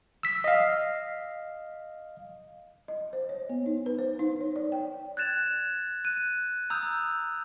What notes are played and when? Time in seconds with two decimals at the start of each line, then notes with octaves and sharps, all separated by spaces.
0.23 E6 B6
0.44 D#5 F5
2.88 D#5
3.13 C5
3.29 C#5
3.49 B3
3.66 D#4
3.86 B4
3.99 C5
4.19 D#4
4.41 C#5
4.56 D5
4.72 G5
5.17 F#6 G#6 A6 E7 F7
6.05 F#6 D#7
6.70 A#5 D#6 E6 G6 F7